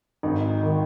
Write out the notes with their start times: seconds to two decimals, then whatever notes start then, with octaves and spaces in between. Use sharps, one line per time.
0.23 G#1 D#4
0.63 D#3